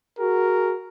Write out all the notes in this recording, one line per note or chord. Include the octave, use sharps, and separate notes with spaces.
F#4 G#4 A#4